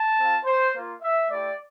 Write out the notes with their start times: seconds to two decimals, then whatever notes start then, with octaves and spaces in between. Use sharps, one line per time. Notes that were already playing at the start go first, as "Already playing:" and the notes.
Already playing: A5
0.17 C4 F4
0.45 C5
0.74 A#3 F4
1.02 E5
1.30 A3 E4 G4 D5